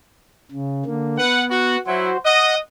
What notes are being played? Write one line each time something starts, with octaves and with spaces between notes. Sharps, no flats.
C#3
D3 A#3
B3 B4 F#5
F#4
F#3 E4 F#4 C5
D#5 F#5 D#6